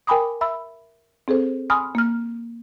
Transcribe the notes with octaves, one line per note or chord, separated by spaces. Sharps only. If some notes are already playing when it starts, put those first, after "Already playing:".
A#4 G5 G#5 B5 D6 D#6
E5 B5 E6
C4 G#4 A4 C5
G#5 B5 C6 D#6 F6
A#3 F6